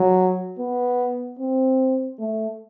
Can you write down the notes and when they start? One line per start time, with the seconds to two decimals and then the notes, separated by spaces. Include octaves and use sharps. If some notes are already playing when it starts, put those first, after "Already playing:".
Already playing: F#3
0.59 B3
1.39 C4
2.19 A3